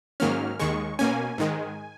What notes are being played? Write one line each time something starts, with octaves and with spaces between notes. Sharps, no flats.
G#2 D#3 F#3 A#3 C#4 F6
D#2 D#3 G#3 C#6
B2 A#3 C#4 G#5
G#2 D#3 G#3